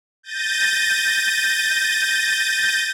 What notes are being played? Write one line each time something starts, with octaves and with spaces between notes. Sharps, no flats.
G6 A6 A#6 D#7